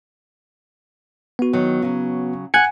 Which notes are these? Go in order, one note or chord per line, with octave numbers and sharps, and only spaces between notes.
B3 F#4
D#3 F#3
C#3 F#3
F#5 G#5 F#6 G#6 C#7